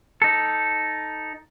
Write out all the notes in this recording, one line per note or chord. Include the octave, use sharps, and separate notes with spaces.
D#4 A4